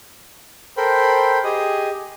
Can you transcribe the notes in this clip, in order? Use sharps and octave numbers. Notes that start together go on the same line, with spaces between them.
A4 A#4 C5 G5 B5 C6
G4 G#4 D#5 G#5 D#6